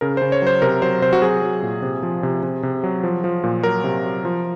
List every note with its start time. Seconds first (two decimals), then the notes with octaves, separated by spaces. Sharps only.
0.01 C#3 A#4
0.17 C#3 C5
0.32 C#5
0.42 F#3 C5
0.62 C3 A#4
0.82 F#3 C5
1.02 C3 C5
1.13 F#4
1.22 F#3 G#4
1.42 F#3
1.63 A#2
1.82 C3
2.03 F3
2.23 C3
2.43 C3
2.63 C3
2.84 F#3
3.03 F3
3.24 F3
3.44 A#2
3.63 F#3 A#4
3.84 C3
4.04 F#3
4.25 F3